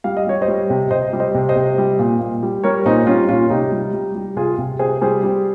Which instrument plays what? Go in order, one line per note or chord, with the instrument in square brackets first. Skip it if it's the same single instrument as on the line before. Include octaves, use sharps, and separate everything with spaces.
[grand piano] G3 F5
D#5
G3 C#5
C5 D#5
G3
C3
C3 C5 D#5
G3
C5 D#5
C3
C5 D#5
C3
G3
A#2
A#2
G3
G3 A#4 C#5
A#2 C4 D#4
G3 C#4 F4
A#2 C#4 F4
C3 D#4 G4
G3
G3
G3
C3 F4 G#4
C3
C3 G#4 C5
G3 G#4 C5
G3